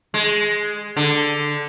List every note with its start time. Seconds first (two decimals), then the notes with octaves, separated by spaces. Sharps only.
0.14 G#3
0.97 D3